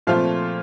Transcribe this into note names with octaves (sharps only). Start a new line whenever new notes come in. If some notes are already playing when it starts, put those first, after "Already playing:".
A#2 F3 A3 C4 F4 F5